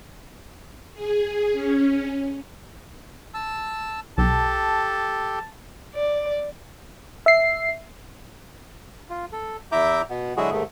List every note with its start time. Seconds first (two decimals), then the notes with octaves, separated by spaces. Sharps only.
0.93 G#4
1.52 C#4
3.34 A5 E6
4.18 B1 G4 A4 A5
5.94 D5
7.26 E5 C7
9.10 F4
9.32 A4
9.72 E2 E4 E5 A#5 D6 G6
10.10 B2 B3
10.37 D3 F#3 G#3 E4 F#4 G#4
10.52 D#2 G#2 A3